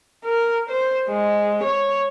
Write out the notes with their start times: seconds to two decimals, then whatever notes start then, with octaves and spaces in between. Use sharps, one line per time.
0.25 A#4
0.70 C5
1.08 G#3
1.63 C#5